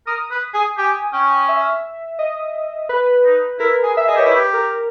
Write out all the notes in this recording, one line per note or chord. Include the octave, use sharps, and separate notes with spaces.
A#4 D#6
B4
G#4
G4 G#5
C#4 G5
E5
D#5
B4
D#4
E4 A#4
G#4
E5
G#4 D#5
G4 C#5
E4
B4
G4
A#4